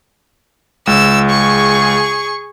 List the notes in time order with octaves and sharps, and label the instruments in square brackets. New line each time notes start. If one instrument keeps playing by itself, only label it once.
[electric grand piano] C#2 [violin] E6
[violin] G#4 C#6